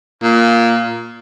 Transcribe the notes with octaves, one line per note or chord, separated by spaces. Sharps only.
A#2